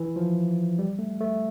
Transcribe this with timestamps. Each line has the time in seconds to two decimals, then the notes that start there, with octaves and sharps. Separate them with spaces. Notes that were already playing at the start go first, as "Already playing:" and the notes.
Already playing: E3
0.16 F3
0.79 G3
0.99 A3
1.21 A3